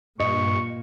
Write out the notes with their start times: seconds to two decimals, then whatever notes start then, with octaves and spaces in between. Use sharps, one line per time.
0.20 G2 A#2 D#5 C#6